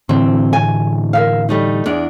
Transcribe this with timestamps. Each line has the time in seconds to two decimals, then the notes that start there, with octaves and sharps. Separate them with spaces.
0.09 A2 D3 E3 C4
0.53 G#5
1.13 A#4 E5 F5
1.49 G3 A3 D#4
1.86 E2 D4 G#4